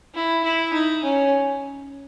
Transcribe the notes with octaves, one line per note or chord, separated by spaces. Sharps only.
E4
E4
D#4
C#4